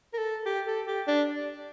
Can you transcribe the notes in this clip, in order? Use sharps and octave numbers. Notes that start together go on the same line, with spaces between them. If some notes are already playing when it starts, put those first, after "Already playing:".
A#4
A4
G4
A4
G4
D4